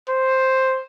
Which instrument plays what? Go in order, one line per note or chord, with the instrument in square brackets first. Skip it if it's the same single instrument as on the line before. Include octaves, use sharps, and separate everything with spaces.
[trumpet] C5